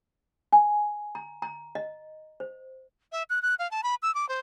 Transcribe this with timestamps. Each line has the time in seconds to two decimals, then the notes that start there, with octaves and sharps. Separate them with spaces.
0.52 G#5
1.15 A#5
1.42 A#5
1.75 D#5
2.40 C5
3.12 E5
3.30 F#6
3.42 F#6
3.59 F5
3.71 A5
3.83 B5
4.02 E6
4.15 D6
4.29 C5